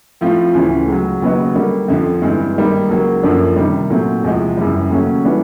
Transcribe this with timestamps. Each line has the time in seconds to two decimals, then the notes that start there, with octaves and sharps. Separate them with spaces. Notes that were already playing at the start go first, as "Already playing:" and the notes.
0.21 A2 F3 A3 C4 F4
0.55 D2 C#3 E3 A3 C#4
0.87 C#2 C#3 F#3
1.22 D#2 C#3 F#3 B3 D#4
1.55 D3 G3 A#3
1.88 F2 D3 F3
2.22 G2 E3 G#3 C4
2.56 G#2 D#3 G3 A#3 D#4
2.89 C#2 C#3 F#3 A#3
3.23 F#2 D3 F3 A#3 D4
3.56 C3 D#3 G3
3.90 A#2 F#3 A3 C4
4.24 E2 C3 F3 G#3
4.57 F#2 C#3 E3 G3
4.90 D#2 C#3 F#3 A3 C#4
5.25 E3 G3 B3 D4